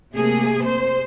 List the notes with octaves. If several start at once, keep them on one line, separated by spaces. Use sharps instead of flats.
C3 A3 A#3 G#4
C5